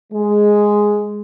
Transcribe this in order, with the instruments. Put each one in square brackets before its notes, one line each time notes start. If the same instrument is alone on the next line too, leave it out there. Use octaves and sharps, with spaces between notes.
[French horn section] G#3